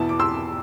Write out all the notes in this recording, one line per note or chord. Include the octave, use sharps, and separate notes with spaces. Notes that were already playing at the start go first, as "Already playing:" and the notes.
Already playing: E2 B2 B3 E4 A5
D6
C6 E6